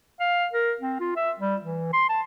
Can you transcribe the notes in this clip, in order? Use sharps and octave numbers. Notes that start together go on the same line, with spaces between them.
F5
A#4
C4
F4
E5
G3
E3
C6
A5